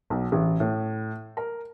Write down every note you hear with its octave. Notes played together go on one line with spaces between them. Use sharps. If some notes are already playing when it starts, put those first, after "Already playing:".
B1
A1
A2
A#4